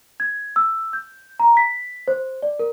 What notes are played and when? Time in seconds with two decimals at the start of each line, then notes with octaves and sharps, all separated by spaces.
0.20 G#6
0.56 E6
0.93 G6
1.40 A#5
1.57 B6
2.08 C5
2.43 D5
2.59 A#4